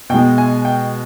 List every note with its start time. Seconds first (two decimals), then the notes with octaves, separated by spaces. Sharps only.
0.10 B2 G#3 G5
0.38 G#5
0.65 G5